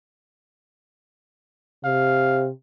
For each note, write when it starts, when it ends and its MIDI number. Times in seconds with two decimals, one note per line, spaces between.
1.85 2.49 48
1.85 2.47 77